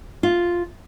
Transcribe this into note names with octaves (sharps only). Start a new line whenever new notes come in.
F4